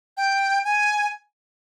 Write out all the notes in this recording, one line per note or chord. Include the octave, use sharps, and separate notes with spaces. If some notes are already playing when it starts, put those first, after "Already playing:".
G5
G#5